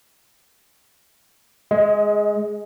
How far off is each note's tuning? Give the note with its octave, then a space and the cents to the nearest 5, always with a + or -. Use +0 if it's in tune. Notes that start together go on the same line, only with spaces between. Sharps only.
G#3 +0 D#5 +35